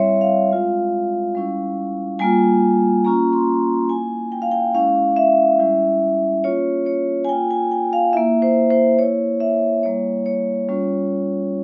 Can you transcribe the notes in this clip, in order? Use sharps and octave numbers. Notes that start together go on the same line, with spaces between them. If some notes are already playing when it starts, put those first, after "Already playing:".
Already playing: G3 C4 E4 C#5 E5
F5
G#3 C4 F4
G3 C#4 E4
G3 A#3 F4 G#5
A#3 C#4 F4 A#5
C6
A#3 E4 G#5
G5
F5
G5
G#3 C#4 E4 F5
E5
G3 C#4 E4
A#3 C#4 F4 C#5
C#5
G#5
A#3 F4 G5
G#5
G5
F5
A#3 E4 E5
C5
C5
A#3 E4 C#5
E5
G3 A#3 E4 C#5
C#5
G3 C#4 F4